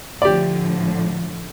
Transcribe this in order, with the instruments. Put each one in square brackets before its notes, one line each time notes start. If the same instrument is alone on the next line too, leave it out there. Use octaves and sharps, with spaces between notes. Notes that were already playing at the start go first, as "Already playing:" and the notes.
[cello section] A2 D3 F3 [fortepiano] G4 D5